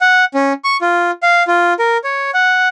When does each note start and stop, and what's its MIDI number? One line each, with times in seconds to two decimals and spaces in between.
0.01 0.25 78
0.34 0.53 61
0.64 0.77 85
0.81 1.11 65
1.23 1.43 77
1.47 1.73 65
1.79 1.98 70
2.04 2.31 73
2.34 2.68 78